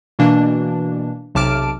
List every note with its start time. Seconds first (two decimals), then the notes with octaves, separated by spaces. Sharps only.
0.19 B2 E3 A#3 D4
1.35 B1 C3 A5 D6 F6 D7